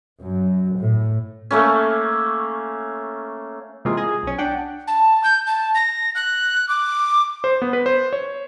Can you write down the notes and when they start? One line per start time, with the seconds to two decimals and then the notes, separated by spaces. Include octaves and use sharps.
0.20 F#2
0.78 A2
1.51 A3 A#3 C#4
3.85 C3 E3 G#3 A#3 F4 G#4
3.97 G#4 D#5
4.23 B1 C#4
4.38 D4 F#5 G5
4.87 A5
5.24 G6
5.47 A5
5.75 A#6
6.15 F#6
6.69 D6
7.44 C5
7.62 B3
7.73 B4
7.86 C5
8.13 C#5